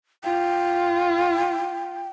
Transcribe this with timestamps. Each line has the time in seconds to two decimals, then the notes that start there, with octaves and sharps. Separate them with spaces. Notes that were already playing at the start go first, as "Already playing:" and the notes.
0.24 F4 G5